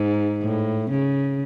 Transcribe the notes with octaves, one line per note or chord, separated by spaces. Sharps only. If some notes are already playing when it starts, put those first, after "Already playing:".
Already playing: G#2
A2
C#3